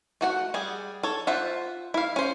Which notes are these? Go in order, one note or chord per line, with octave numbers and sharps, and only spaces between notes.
A3 F#4 F#5
G3 G#4
A4 C#5
F4 C5 E5 F#5
E4 F5
C#4 C5